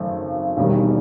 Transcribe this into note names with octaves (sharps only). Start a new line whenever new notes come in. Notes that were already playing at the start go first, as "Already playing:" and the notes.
Already playing: G#1 F#2 C#3 A3
E1 D#2 D#3 G3